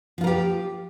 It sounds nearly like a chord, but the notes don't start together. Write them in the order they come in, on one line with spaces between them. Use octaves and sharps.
F3 F4 A#4 G4